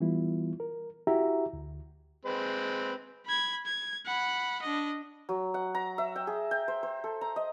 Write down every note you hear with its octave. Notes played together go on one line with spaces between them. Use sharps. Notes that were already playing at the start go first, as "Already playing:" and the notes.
E3 G3 B3 E4 F4
A#4
E4 F#4 G4 E5 A#5
D2
G#3 C4 B4
B5 G#6
G#6
F#5 B5
D4 D#5
F#3
F#5
A#5
E5
G5
G#4
G5
C5
C5
A4
A#5
D#5